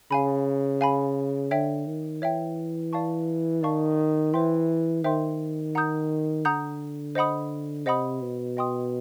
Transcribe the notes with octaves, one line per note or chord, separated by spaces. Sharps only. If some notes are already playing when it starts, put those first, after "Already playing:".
C#3 F5 G#5 B5
F5 G#5 B5
D3 C#5 E5 G5
D#3
E3 C#5 E5 G5
D5 F5 A5 C#6
D#3 D5 F5 A5 C#6
E3 C5 E5 G5 C6
D#3 C5 E5 G5 C6
F#5 A#5 D#6 G6
D3 F#5 A#5 D#6 G6
C5 D#5 F#5 B5 D#6
C3 C5 D#5 F#5 B5 D#6
B2
D#5 G5 C6 D#6